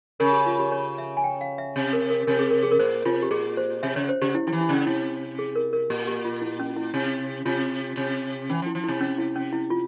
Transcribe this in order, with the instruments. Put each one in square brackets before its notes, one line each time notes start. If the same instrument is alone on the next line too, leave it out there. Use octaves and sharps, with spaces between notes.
[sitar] C#3 [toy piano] A#4
[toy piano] G4
F4
G4
C#5
E5
G#5
G5
F5
E5
[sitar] C3
[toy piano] A#4
A#4
[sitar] C3 [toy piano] A#4
[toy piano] G#4
A#4
G#4
A#4
[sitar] A#2 [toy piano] C5
[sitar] C3 [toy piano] F4
[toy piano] G4
[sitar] A#2 [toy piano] G#4
[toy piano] C5
[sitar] C3 [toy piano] E5
[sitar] C#3 [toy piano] C#5
[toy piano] C5
[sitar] C#3 [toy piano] G4
[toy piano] E4
[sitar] F3 [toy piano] E4
[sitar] E3
[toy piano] E4
[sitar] C#3 [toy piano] C#4
[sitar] C3 [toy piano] E4
[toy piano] G#4
A#4
A#4
[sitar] A#2 [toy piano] G4
[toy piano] G4
F4
E4
C#4
E4
[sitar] C3
[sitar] C3 [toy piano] F4
[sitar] C3
[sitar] E3 [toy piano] C#4
[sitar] F3
[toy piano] E4
[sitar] F3
[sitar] C3 [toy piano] E4
[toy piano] C#4
E4
C#4
E4
F4